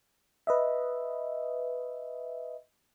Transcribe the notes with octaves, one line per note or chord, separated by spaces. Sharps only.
B4 D#5 E5